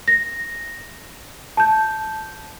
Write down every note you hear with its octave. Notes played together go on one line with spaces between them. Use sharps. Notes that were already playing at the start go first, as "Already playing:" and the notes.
A#6
A5 G6